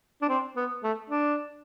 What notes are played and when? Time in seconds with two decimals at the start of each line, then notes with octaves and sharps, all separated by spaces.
0.22 D4
0.29 C4
0.56 B3
0.83 A3
1.10 D4